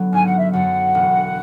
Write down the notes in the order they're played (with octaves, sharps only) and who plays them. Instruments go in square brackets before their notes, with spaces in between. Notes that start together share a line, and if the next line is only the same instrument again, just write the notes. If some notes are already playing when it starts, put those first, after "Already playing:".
Already playing: [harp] D3 F#3 B3
[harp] G#1 [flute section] G#5
[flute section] F#5
E5
[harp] F#2 D3 [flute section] F#5
[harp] E1